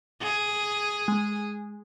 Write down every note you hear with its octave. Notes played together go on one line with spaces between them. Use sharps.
G#4
G#3